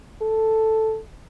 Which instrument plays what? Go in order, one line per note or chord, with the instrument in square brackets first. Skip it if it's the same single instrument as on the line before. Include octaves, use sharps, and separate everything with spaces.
[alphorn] A4